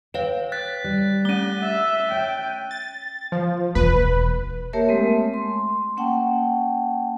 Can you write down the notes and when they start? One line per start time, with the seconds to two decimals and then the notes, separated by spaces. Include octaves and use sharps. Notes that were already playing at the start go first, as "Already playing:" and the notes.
0.14 B4 C#5 F5 G5
0.52 F#6 A6 B6
0.84 G3
1.25 A3 C#4 D#7 G7
1.63 E5 A6
2.12 C#5 G5
2.71 A6
3.32 F3
3.75 E1 E2 B4
4.73 A#3 G4 A#4 C#5 E5 A5
4.89 G#3 A3 C4
5.34 C6
5.97 A#3 C#4 F#5 G5 A5